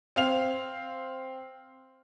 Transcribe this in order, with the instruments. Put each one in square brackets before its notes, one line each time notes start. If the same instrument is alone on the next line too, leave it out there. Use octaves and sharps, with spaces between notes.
[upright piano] C4 F5 F7